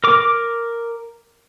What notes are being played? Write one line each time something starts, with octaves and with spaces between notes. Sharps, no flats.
A#4 D6